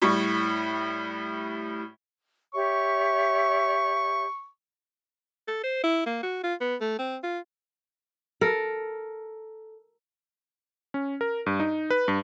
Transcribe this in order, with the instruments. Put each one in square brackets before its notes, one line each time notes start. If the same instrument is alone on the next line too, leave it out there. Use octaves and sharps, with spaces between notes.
[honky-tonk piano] A2 G3 C#6
[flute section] G4 C#5 E5 [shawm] C#6
[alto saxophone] A4
C5
E4
A#3
F#4
F4
B3
A3
C4
F4
[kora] A4 A#4
[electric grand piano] C#4
A#4
G2
D#4
B4
G2